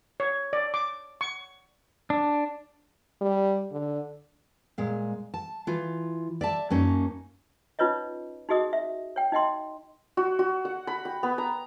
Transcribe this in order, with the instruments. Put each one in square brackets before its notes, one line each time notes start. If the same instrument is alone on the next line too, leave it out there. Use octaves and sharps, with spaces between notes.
[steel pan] C#5
D5
D6
C#6
[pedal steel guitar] D4
[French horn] G3
D3
[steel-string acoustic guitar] A#2 G#3 F5
A5
E3 F4
D5 E5 A5
F#2 A#3 C#4 D#4
[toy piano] C#4 D#4 F4 B4 C#5 D#5
D#4 F#4 G#4 D#5 D#6
E5
C#5 G5
D#4 D#5 G5 C6
[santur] F#4
F#4
F#5
B5
G5
B3
A#5